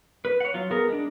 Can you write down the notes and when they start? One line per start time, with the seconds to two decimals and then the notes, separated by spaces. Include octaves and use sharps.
0.25 B4
0.40 C#5 F#5
0.54 F#3 F4
0.71 B3 G#4 A#4
0.88 G#3 D4